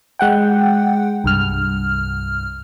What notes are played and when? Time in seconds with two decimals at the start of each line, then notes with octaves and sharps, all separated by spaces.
0.19 G#3 F#5 G5
1.24 C2 G2 F6